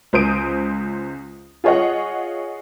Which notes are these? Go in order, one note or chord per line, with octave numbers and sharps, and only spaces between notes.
C#2 C5 D#6 D7 D#7
F4 G#4 C#5 D#5 F#5